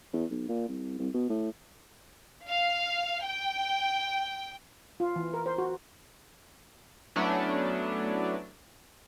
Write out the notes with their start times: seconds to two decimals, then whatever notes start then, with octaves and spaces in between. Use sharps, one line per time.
0.13 E2
0.31 B1
0.49 A#2
0.69 C2
0.99 C2
1.14 B2
1.29 A2
2.47 F5
3.23 G5
5.00 F4
5.16 E3
5.34 A#4
5.46 C5
5.58 F#4
7.16 F#3 A3 B3 C#4 D4 E4